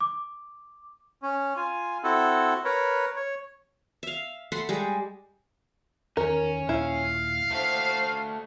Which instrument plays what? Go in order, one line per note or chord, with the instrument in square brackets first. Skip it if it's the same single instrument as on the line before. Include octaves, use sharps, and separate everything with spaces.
[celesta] D6
[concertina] C#4
F4 G#5
C4 E4 F#4 A4
A#4 B4 C#5
C#5
[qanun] E5 F5
A3 F#5 B5 C6
G3 G#3
[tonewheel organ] E2 D#3 [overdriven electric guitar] C#4 [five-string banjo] A#4
[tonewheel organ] D#2 A#2 [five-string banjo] E4 [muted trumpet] F5
[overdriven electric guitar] A3 F#4 [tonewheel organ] C5